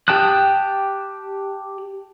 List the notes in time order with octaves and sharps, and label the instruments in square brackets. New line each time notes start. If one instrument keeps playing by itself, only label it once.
[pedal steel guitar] G4 G5 A5 D#6 F#6